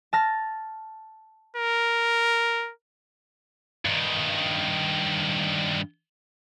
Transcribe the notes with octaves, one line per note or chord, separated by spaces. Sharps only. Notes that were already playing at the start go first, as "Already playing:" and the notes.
A5 F6 A#6
A#4
G2 D#3